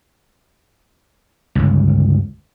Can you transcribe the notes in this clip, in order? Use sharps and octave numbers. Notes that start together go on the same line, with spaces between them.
G1 C#2